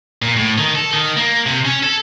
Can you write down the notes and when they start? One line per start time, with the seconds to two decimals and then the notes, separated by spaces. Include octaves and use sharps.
0.22 A#2
0.37 A2
0.58 D#3
0.75 A4
0.93 D#3
1.17 A#3
1.46 C3
1.65 C#4
1.83 A4